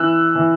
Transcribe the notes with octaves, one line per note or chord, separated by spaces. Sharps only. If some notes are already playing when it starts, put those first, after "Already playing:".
Already playing: E3 E6 F#6
E3